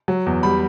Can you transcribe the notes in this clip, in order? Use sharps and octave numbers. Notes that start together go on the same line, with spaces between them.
F#3
E2
G3 B5